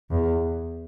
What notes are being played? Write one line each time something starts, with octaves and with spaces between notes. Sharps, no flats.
E2